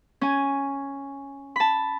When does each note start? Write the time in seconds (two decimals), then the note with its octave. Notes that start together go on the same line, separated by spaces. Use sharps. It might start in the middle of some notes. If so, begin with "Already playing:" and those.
0.21 C#4 G#5
1.56 A5 B5